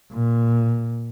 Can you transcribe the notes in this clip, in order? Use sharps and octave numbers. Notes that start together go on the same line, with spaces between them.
A#2